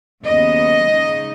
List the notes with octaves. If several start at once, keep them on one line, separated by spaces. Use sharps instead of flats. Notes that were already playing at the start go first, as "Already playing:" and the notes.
D#2 C#3 F#3 B3 D#5
C#3 G#3 D#4